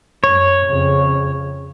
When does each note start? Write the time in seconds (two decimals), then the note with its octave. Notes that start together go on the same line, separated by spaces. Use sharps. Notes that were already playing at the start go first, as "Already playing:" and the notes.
0.24 F#2 C#5
0.66 F2 C#3